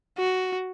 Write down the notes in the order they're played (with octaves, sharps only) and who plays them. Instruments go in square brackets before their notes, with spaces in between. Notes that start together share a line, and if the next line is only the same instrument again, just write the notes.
[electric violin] F#4